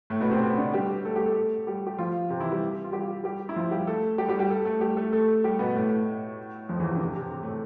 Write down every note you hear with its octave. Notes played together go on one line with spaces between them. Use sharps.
A2 A3
B2 B3
C3 C4
C3 C4
D3 D4
G3 G4
A3 A4
G3 G4
A3 A4
G3 G4
G4
F3 F4
C3 C4
E3 E4
G3 G4
F4
G3 G4
G3 G4
E4
F3 F4
G3 G4
A3 A4
G3 G4
G3 G4
G3 G4
A4
A3 A4
G3 G4
A3 A4
A3 A4
G3 G4
B2 B3
A2 A3
F2 F3
E2 E3
C3
D3
C3
C3
C3
A2 A3